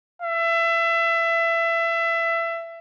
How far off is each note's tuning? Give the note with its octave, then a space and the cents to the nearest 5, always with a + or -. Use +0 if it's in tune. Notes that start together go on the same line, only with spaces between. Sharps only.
E5 +25